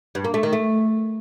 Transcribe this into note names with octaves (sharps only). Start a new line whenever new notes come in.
G2
A#3
A3
D#3
A3